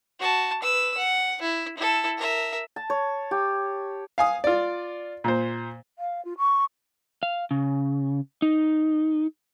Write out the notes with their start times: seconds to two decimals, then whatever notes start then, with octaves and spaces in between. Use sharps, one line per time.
0.19 F#4 A5
0.63 B4 E6
0.97 F#5
1.41 E4
1.77 E4 A4
2.18 A#4 E5
2.76 A5
2.90 C#5
3.31 G4
4.18 F5 G#5 D#6
4.44 F4 D5
5.24 A#2 C5
5.98 F5
6.24 F4
6.38 C#6
7.23 F5
7.51 C#3
8.42 D#4